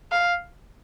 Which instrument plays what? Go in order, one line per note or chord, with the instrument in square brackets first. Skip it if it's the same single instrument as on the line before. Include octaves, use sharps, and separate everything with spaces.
[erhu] F5